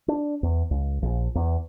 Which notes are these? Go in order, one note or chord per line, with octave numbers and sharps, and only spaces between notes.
D4
E2
C#2
A#1
E2